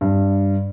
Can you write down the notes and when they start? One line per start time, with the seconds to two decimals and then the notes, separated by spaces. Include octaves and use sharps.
0.01 G2